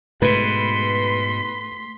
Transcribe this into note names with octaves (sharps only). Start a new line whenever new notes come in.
G#2 B2 A3 B4 C6 B6